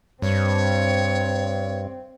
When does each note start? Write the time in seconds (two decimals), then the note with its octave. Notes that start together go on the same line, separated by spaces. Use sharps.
0.22 G2 C4 C#5